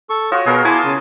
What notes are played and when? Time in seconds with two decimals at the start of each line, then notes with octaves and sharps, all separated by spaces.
0.10 A4 C#6
0.32 F4 F#4 C#5 D#6
0.46 B2 G#4 A#4 A#5
0.65 E4 G#5 A5 C6 D6
0.85 C#3